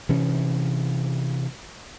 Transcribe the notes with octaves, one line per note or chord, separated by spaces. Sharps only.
C3 E3 C#4